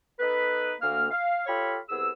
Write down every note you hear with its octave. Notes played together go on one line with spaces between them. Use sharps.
B3 D#4 A4 B4
D2 A#3 F6
F5
F4 G4 A4 C#5 F5 B5
C2 B3 G#4 E6